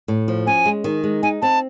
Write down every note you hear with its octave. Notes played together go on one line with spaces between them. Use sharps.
A2
F3
C#4 G#5
G#3
D#3
G#3
D#4 G#5
C4 A5